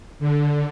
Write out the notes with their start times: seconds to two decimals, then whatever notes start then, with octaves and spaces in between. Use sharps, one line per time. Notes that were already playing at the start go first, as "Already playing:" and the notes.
0.19 D3